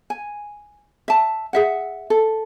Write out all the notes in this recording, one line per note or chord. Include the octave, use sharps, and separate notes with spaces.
G#5
E5 A5
G#4 E5 F#5
A4